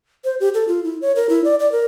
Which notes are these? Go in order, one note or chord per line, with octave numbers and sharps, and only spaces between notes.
C5
G4
A4
F4
E4
C#5
A#4
E4
D5
D5
A#4